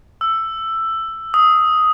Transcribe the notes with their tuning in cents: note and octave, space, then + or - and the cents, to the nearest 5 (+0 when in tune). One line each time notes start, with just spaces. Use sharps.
E6 +10
D#6 +10